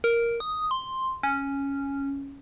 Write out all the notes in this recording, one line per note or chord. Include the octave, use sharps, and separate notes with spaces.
A#4
D#6
C6
C#4